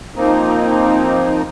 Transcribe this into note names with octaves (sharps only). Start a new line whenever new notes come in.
F3 A#3 C4 D#4